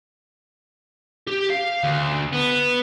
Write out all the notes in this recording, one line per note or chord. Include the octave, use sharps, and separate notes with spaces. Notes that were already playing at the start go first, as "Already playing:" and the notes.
G4
F5
D2
B3